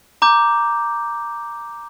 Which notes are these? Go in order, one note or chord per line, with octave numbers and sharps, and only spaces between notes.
A#5 D6 G6